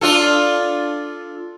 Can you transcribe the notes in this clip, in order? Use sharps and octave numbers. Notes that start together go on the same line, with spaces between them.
D4 F4 A4